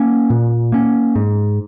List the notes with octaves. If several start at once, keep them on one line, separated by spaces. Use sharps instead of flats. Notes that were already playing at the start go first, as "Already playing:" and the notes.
Already playing: A#3 C#4
A#2
A#3 C#4
G#2